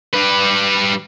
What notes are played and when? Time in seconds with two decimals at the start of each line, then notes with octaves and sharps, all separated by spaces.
0.14 G3 B4